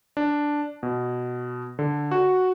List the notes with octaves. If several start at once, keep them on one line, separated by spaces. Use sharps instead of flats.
D4
B2
D3
F#4